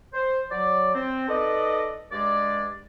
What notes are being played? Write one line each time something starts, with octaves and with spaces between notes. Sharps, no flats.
C5
F#3 D5
C4
D#4 A4 B4 D5 D#5
G2 G#3 D5